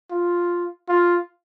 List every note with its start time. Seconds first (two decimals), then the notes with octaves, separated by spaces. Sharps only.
0.11 F4
0.89 F4